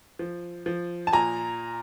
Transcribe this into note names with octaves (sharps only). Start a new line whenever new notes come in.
F3
F3
A5
A#2 G#5 A#5